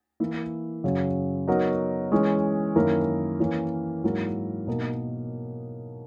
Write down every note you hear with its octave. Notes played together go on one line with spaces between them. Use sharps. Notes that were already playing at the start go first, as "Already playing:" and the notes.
E3 A#3 E4
F#2 C#3 F#3
F#3 B3 D#4 F#4 A#4
E3 G#3 C#4
F#2 D#3 A#3 E4 A#4
E3 A#3 C#4
G#2 F#3 A#3 E4 A#4
B2 A#3 D#4 A#4